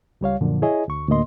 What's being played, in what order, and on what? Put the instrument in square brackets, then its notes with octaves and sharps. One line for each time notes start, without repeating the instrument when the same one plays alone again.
[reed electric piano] C#2 G3 C#5 F5
F#2 A#2 D3 F3
E4 G#4 C#5 D#5 G#5
D2 C#6
D2 A2 A#3 D#5 C6